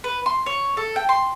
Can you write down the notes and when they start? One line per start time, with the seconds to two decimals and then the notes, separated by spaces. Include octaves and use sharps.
0.04 B4
0.26 C6
0.46 C#5
0.77 A4
0.96 G5
1.09 C6